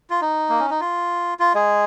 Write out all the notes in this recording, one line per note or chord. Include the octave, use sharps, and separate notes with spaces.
F4
D#4
A#3
C#4
D#4
F4
F4
G#3 G#4